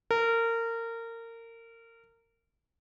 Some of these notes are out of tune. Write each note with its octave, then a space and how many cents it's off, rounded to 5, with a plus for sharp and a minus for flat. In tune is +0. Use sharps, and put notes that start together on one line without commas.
A#4 -25